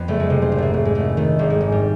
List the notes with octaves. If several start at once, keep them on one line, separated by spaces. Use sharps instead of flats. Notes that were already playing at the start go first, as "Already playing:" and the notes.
Already playing: F2 B3 D5
F#1 A3
G#3
C3 A3
C4
G#1
A3 A#3
G#2 A3
G#3
G#1 A3
D#3 A3
G#1 G3
G#3
G#2
G3